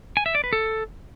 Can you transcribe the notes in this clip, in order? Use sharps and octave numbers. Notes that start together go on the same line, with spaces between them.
G#5
E5
D5
B4
A4